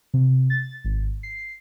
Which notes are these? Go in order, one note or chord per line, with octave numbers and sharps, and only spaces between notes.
C3
A6
G#1
C7